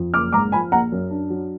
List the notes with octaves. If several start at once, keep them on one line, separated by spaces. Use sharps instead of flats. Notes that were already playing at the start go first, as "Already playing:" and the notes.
Already playing: F2
F#1 D6 F6
G#2 A#5 D6
F3 G#5 B5
A#1 F#5 A#5
F#2
D4
F#3